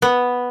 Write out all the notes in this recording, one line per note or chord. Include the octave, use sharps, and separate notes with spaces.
B3